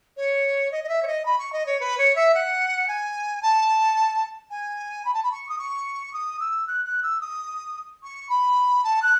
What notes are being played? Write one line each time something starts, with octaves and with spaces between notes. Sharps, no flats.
C#5
D#5
D#5
E5
C#5
D#5
B5
C#6
D#5
C#5
B4
C#5
E5
F#5
G#5
A5
G#5
B5
A5
B5
C#6
D#6
C#6
D#6
E6
F#6
F#6
E6
D#6
C#6
B5
A5
F#6